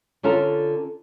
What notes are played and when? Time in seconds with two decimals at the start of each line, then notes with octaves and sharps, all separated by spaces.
0.23 D3 C#4 F4 A4 A#4